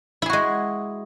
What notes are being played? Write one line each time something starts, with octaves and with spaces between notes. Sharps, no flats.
G#3 E4 F#4 G#4